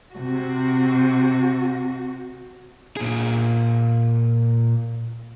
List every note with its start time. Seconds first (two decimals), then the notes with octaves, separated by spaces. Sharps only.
0.15 C3 F#4
2.97 A#2 G#4